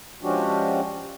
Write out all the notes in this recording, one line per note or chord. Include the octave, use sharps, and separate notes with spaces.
F3 G#3 C#4 D4 F#4 G4